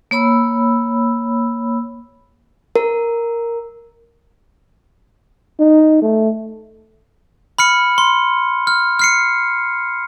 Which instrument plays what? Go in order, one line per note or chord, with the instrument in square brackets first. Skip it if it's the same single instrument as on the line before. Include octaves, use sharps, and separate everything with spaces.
[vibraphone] A#3 C#5 B5 E6
[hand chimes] A#4
[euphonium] D#4
A3
[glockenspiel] B5 F6 C#7
C6
F6
F6 C7 C#7